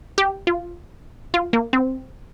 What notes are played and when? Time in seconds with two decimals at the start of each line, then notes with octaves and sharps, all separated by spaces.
0.18 G4
0.47 F4
1.34 F4
1.53 A#3
1.73 C4